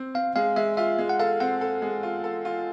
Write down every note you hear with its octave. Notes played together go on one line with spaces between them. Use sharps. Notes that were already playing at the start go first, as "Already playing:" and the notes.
Already playing: C4
C4 F5
G#3 F5
G#3 E5
F4 E5
G#3
F#5
A4 F5
C4 F#5
A4
G#3
F4
A4
F4